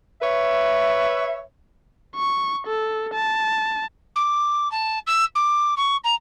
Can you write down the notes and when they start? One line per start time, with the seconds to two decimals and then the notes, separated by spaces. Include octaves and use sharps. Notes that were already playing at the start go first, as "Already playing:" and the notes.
0.22 B4 C#5 E5
2.15 C#6
2.67 A4
3.14 A5
4.15 D6
4.71 A5
5.06 E6
5.35 D6
5.77 C#6
6.04 A#5